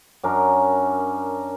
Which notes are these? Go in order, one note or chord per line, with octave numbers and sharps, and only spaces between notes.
F#2 C#4 D4 A#4